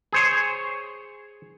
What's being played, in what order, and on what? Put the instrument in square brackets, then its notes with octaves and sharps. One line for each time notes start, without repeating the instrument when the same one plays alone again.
[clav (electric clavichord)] G#4 C5 C#5